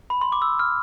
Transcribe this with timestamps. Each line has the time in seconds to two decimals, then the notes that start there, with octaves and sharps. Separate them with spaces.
0.10 B5
0.21 C6
0.32 D6
0.42 E6
0.59 F6